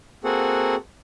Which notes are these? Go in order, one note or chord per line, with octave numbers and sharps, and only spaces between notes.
A#3 C4 F#4 G#4 A4 F#5